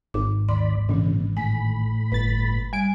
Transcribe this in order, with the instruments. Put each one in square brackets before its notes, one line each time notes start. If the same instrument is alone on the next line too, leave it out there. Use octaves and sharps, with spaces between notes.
[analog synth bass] G#1 [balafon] D6
[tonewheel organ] D#2 D5 B5 [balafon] C6
[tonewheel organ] A#2 C#3 [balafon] E3 D4
[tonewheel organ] A2 B5 [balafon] G#5
[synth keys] G1 A6 [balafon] B4
[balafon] G3 [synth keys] G#5 D7